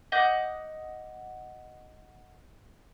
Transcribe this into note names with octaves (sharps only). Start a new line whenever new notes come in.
D#5 F#5 D6 G6